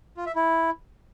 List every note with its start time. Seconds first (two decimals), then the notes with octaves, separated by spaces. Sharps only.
0.17 F4
0.26 E5
0.35 E4